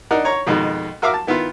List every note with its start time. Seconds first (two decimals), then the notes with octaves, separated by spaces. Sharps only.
0.11 D4 D#4 A#4 F#5
0.25 C#5 A#5 C#6
0.47 F2 B2 D#3 G#3
1.02 F#4 A#4 E5 F5 A#5 D6
1.14 A5
1.27 D#3 B3 E4 F4